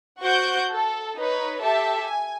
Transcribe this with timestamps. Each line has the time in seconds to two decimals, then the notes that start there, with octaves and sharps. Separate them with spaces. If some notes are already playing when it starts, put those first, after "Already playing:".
0.20 F#4 C5 F#5 C#6 G6 D7
0.71 A4
1.18 D#4 B4 C#5
1.62 G4 A4 E5 A5
2.06 G#5